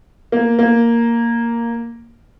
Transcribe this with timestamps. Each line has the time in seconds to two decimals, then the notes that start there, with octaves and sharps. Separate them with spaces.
0.32 A#3
0.59 A#3